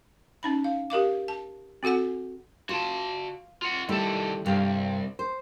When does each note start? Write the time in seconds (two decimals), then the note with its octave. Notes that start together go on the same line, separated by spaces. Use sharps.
0.43 C#4 D#4 B5
0.64 F5
0.90 G4 A#4 F5 D6
1.28 A5
1.83 C4 F#4 A4 F#5 G#5
2.69 F4 F#4 A5
3.62 F4 F#5
3.89 D#3 G3 A3 E4 A4
4.46 C2 G2 G4 F5
5.19 C5